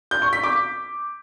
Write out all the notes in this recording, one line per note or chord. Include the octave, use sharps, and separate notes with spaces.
G6
C#6
B6
D6